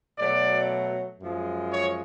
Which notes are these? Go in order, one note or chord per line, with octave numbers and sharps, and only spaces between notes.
B2 F#3 A3 D5
F#2 F3 G#3
C#5